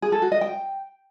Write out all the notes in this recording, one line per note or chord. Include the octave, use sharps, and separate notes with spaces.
G#4
A4
F#4
D#5
G5